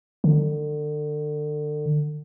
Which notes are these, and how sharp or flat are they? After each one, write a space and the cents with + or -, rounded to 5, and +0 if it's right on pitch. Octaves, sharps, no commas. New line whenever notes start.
D3 +30